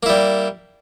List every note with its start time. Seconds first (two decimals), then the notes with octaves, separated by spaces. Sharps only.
0.03 A#3
0.06 E4
0.09 G3